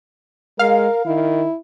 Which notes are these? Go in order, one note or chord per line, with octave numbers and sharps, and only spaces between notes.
G#3 A#4 F5
D#3 E4